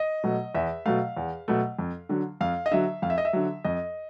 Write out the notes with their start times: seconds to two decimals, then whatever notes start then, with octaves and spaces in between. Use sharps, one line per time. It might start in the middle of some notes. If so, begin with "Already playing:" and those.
Already playing: D#5
0.24 B2 F#3 A3
0.55 E2 E5
0.85 B2 F#3 A3 F5
1.17 E2
1.48 B2 F#3 A3
1.79 F2
2.09 D3 F#3
2.41 F2 F5
2.66 D#5
2.71 D3 F#3 E5
3.02 F2 F5
3.10 E5
3.18 D#5
3.25 E5
3.33 D3 F#3
3.64 F2 D#5